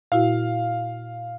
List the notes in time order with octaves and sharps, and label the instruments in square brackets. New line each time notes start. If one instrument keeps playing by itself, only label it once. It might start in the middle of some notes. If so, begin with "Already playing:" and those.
[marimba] A#2 E4 F#4 [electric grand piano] F5